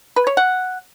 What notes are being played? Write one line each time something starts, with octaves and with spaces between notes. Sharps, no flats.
B4
C#5
F#5